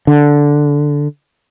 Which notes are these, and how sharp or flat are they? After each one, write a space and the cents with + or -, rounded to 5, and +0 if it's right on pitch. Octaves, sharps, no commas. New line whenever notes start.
D3 -5